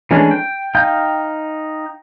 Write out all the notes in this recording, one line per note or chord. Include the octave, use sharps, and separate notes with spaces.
E3 G#3 A3 C#4 D4
G5
D#4 F5 G5 G6